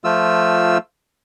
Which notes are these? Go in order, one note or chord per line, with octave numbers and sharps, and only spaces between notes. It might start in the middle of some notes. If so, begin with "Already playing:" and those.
F3 A3 F4 E6